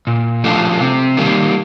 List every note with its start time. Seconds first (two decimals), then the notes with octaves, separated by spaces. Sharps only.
0.07 A#2
0.44 F3 A3 D4 F4
0.81 C3
1.17 D#3 G3 A#3